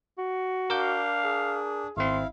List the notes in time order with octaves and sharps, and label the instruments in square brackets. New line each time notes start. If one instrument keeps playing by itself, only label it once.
[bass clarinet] F#4
[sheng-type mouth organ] D4 [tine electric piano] A#4 D6 G6 [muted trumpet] F5
[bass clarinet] G#4
[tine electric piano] G#1 C4 [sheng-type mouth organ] E4 F5 [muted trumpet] C6